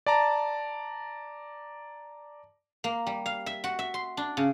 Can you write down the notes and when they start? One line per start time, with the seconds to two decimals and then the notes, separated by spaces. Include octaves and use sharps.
0.06 D5 A5 A#5
2.84 A#3
3.07 G3
3.26 F5
3.46 E5
3.64 F#4
3.79 E5
3.94 C6
4.17 D4
4.37 C#3